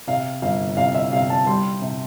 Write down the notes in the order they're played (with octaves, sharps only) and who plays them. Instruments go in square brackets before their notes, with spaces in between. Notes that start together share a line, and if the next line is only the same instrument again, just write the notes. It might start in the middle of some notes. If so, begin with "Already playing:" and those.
[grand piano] C3 F5
G1 F5
C3 F5
E5
C3 F5
A5
G3 C6
C3